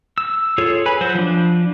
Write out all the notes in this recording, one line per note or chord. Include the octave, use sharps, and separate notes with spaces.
E6
F4 G#4 A4 C#5
B4 G#5 B5
F#3 F#4 C5
F3 D4